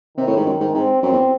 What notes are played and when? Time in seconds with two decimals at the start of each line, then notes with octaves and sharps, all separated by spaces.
0.17 C3 D#3
0.27 A2
0.36 G#2
0.46 F#2
0.60 G#2
0.74 G#2 C4
1.03 F#2 C4
1.12 E2